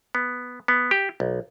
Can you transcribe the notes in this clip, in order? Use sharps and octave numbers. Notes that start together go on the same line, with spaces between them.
B3
B3
G4
B1